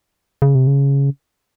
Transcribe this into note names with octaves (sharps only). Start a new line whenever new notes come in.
C#3
C3
C#3